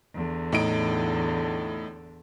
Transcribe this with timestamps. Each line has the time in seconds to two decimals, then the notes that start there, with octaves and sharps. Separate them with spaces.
0.13 E2 D3
0.52 A2 D#4 D7